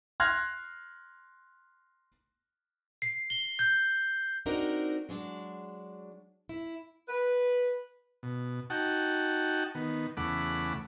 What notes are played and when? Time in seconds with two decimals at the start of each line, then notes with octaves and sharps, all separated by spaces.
0.20 C6 F6 F#6 G#6 A#6
3.02 C7
3.30 G7
3.59 G6
4.46 C4 D4 D#4 F#4 A#4
5.09 F#3 G#3 D4
6.49 E4
7.09 B4
8.23 B2
8.70 D#4 F#4 F#5 G5 A5
9.75 D#3 B3
10.17 E2 C#3 A3 F#5 B5 D6